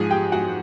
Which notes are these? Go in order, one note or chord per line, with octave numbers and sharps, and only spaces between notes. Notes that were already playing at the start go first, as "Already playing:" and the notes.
Already playing: G#2 F3 G#4 G#5
G4 G5
F#4 F#5